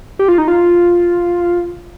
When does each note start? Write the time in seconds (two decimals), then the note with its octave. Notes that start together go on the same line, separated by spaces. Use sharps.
0.19 G4
0.28 F4
0.38 D#4
0.48 F4